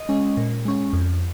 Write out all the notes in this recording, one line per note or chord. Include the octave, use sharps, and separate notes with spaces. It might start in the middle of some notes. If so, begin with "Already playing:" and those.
Already playing: D#5
G#3 C#4
A#2
G#3 C#4
F2